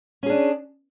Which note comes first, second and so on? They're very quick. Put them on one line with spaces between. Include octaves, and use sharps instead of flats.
C#4 G#4 D4